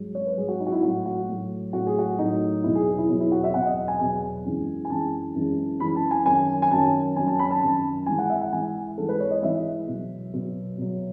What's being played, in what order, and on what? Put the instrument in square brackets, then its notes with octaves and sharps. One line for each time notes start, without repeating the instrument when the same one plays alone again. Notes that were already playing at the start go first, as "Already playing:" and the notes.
Already playing: [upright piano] G#2 F#3
C#5
B4
G#2 F#3 G#4
F#4
D#4
F#4
E4
A2 F#3 F#4
F#4
A2 F#3
A2 F#3 F#4
G#4
F#4
A2 F#3 D#4
E2 B2 F#3 E4
G#4
E4
E2 B2 F#3
E4
F#4
E5
E2 B2 F#3 F#5
D#5
G#5
E2 B2 F#3 G#5
F#2 E3 G#3
G#5
F#2 E3 G#3 A5
F#2 E3 G#3
F#2 E3 G#3 B5
A5
G#5
F#2 D#3 F#3 G#5
G#5
F#2 D#3 F#3 A5
F#2 D#3 F#3 G#5
A5
B5
A5
F#2 D#3 F#3 A5
G#2 E3 G#3 G#5
F#5
E5
F#5
G#2 E3 G#3 G#5
G#2 E3 G#3 A4
B4
C#5
D#5
G#2 E3 G#3 E5
B2 F#3
B2 F#3
B2 F#3